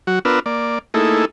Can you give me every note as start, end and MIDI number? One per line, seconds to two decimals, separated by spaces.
0.07 0.19 54
0.07 0.19 66
0.25 0.40 59
0.25 0.40 62
0.25 0.40 65
0.25 0.40 70
0.25 0.40 71
0.25 0.40 88
0.46 0.79 58
0.46 0.79 74
0.94 1.25 57
0.94 1.25 58
0.94 1.25 63
0.94 1.25 64
0.94 1.25 68
0.94 1.25 69